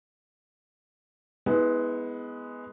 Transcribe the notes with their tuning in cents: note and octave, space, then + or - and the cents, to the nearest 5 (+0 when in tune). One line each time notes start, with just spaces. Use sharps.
G#3 +0 B3 +0 E4 -35